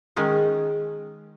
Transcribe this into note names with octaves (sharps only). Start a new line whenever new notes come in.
D#3 G#3 C#4 D#4